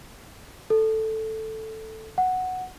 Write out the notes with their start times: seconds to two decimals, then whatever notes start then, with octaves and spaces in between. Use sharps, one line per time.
0.70 A4
2.18 F#5